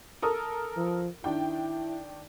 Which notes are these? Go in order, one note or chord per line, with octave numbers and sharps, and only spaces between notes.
A4 A#4 D#6
F3
D#3 D4 E4 G5